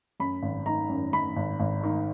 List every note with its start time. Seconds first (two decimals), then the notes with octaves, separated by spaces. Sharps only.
0.20 F#2 B5
0.43 G#1
0.66 D#3 A#5
0.89 F#2
1.13 F#2 B5
1.37 G#1
1.60 G#1
1.83 D#3